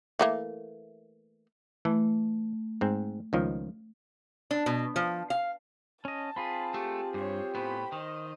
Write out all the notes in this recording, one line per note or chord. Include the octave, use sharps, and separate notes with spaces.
E3 A3 A#3
E3 A3
G#2 C4
C#2 D#3 F3
D4
B2
F3
F5
C#4 D#5 A5
C4 F4 G#4 B5
A3 G4
G2 G4 C5 C#5
A2 B3 C5 B5
D#3 C5 D#5